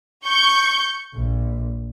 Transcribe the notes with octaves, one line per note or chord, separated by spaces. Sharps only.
C#6 G6
A#1